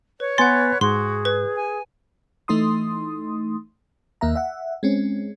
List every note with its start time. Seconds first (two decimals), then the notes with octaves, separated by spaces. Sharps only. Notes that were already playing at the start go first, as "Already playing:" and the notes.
0.20 B4 C#5
0.38 B3 B4 F#5 G#5 C6 A6
0.81 G#2 F#4 G#4 C6
1.25 B4
1.56 G#5
2.48 E3 A3 D#4 C6 D#6
4.21 D#2 A#3 E5 A#5
4.36 E5 F#5
4.83 G#3 C4 C#4